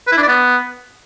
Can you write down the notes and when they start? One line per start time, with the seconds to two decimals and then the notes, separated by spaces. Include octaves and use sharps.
0.07 B4
0.12 E4
0.17 D4
0.23 D5
0.28 B3